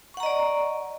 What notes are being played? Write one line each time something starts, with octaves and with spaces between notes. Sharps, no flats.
D5 D#5 F#5 A#5 C#6